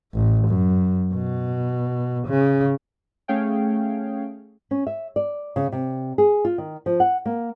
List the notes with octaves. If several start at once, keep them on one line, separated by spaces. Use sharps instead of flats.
A1
F#2
B2
C#3
A3 C#4 G#4 C#5 F5 G5
C#4
E5
D5
C#3
C3
G#4
F4
D#3
F3
F#5
A#3